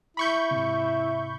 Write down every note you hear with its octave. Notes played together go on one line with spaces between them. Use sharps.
E4 B5 C#6 G6
G#2 C3